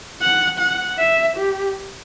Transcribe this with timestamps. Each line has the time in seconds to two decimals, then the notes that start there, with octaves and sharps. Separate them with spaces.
0.21 F#5
0.59 F#5
0.98 E5
1.36 G4